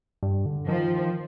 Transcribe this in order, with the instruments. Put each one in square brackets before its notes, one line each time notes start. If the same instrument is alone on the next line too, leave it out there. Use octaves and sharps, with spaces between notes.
[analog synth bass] G2
D3
[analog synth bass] D#3 [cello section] F3